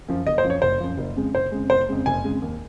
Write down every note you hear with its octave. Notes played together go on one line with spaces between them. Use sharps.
F#2 F3
F#1 D#5
C5
F#2 F3
C#5
F#1 C5
F#2 F3
F#1
F2 C#3 G#3
F#1 C5
F2 C#3 G#3
F#1 C5
F2 C#3 G#3
F#1 G#5
F2 C#3 G#3
D#2